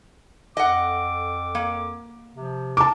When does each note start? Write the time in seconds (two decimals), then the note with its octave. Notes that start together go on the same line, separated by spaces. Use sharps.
0.57 F2 A4 D#5 F#5 D6
1.55 A#3
2.35 C3 F3
2.77 A5 D6